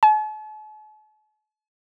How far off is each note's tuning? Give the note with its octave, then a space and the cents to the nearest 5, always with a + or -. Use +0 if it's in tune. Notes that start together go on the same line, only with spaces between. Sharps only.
A5 -45